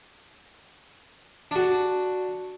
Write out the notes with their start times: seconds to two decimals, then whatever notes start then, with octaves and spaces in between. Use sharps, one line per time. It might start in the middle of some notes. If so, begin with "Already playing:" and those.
1.51 D4 F#4